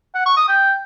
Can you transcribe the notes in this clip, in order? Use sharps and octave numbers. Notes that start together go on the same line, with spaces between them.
F#5
C#6
D#6
G5